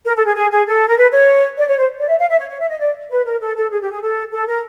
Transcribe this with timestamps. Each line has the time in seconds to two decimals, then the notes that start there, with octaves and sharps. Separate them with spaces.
0.05 A#4
0.16 A4
0.26 G#4
0.36 G#4
0.51 G#4
0.67 A4
0.87 A#4
0.96 B4
1.12 C#5
1.58 D5
1.68 C#5
1.78 C5
1.98 D5
2.09 E5
2.19 F5
2.29 E5
2.39 C#5
2.50 C#5
2.59 E5
2.70 D#5
2.79 D5
3.10 B4
3.25 A#4
3.41 A4
3.56 A4
3.71 G#4
3.81 G4
3.92 G#4
4.02 A4
4.32 A4
4.47 A#4